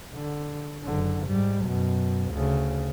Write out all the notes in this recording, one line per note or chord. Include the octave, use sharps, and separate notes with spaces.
D3
F#1 D3
G#2 G3
F#2 B2
D2 C#3